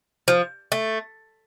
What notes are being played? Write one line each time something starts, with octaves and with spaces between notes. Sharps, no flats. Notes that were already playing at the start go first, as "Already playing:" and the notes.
F3
A3